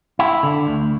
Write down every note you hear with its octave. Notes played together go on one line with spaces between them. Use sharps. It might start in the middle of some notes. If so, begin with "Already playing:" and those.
E4
D3
D2